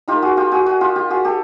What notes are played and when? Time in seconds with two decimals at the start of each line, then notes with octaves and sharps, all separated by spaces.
0.08 A#3 D#4 F4 G4
0.22 F#4 G#4
0.37 F4 G4
0.51 F#4 G#4
0.66 F#4 G#4
0.81 F4 G4
0.96 F4 G4
1.10 F#4 G#4
1.25 G4 A4